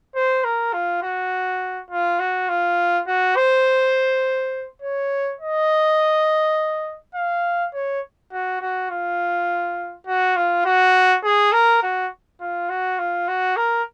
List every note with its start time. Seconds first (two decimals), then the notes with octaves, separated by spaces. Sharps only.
0.16 C5
0.45 A#4
0.74 F4
1.03 F#4
1.91 F4
2.20 F#4
2.49 F4
3.08 F#4
3.36 C5
4.82 C#5
5.40 D#5
7.15 F5
7.74 C#5
8.33 F#4
8.61 F#4
8.91 F4
10.07 F#4
10.36 F4
10.65 F#4
11.24 G#4
11.53 A#4
11.83 F#4
12.41 F4
12.70 F#4
12.99 F4
13.28 F#4
13.57 A#4